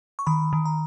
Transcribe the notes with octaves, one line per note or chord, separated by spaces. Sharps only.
C#6
D#3 B5
D#3
A#5